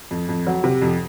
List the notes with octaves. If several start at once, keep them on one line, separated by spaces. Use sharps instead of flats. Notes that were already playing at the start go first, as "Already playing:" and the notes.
F2
F2
F#3
C3
F2